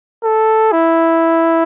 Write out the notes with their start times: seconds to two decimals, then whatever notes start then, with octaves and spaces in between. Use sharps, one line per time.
0.24 A4
0.72 E4